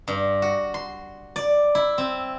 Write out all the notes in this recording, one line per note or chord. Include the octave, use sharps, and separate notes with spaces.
G2
F#4
C6
D5
E4
C4